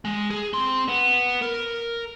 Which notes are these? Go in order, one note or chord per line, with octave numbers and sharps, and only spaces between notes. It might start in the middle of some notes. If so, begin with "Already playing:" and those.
G#3
G#4
C4 C6
B3
A#4